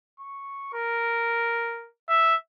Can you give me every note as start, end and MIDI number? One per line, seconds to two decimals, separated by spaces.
0.20 0.71 85
0.73 1.89 70
2.09 2.35 76